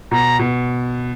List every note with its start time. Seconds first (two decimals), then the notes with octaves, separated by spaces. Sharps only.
0.11 B2 A#5
0.39 B2